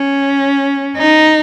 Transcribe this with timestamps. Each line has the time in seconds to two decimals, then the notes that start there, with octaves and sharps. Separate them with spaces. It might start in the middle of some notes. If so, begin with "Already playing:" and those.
Already playing: C#4
0.97 D#4